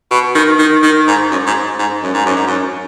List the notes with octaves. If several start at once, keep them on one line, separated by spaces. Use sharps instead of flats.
B2
D#3
D#3
D#3
G#2
F#2
G#2
G#2
F#2
G#2
F#2
G#2
F#2